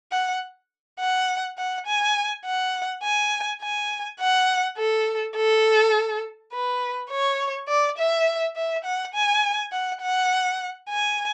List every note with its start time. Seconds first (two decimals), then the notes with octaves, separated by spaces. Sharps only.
0.12 F#5
1.00 F#5
1.58 F#5
1.86 G#5
2.45 F#5
3.03 G#5
3.62 G#5
4.20 F#5
4.78 A4
5.36 A4
6.53 B4
7.10 C#5
7.68 D5
7.98 E5
8.56 E5
8.85 F#5
9.14 G#5
9.72 F#5
10.02 F#5
10.89 G#5